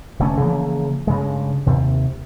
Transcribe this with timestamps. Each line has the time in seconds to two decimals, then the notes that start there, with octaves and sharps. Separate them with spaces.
0.19 F1 D3 A3 C#4
0.40 C#3 E3 F3 A#3
1.07 G2 C#3 G#3
1.66 D#2 C3